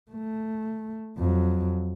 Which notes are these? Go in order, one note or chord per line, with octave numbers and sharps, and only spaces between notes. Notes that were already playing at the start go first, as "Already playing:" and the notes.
A3
F2 F#3